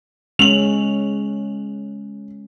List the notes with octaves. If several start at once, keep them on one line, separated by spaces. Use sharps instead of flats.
G#3 C#4 F7 F#7